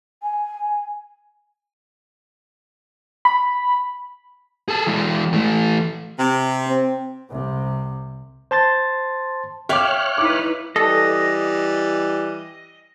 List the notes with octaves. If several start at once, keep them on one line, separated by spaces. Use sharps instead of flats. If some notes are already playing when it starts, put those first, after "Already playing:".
G#5
B5
G#4 A4
E3 G#3
E3 A3
C3
C4
C2 C3
C5 A5 C6 A6
C#5 E5 F5 G5 D6 F6 F#6
D#4 E4 B4 D6
E3 G3 A4 D#5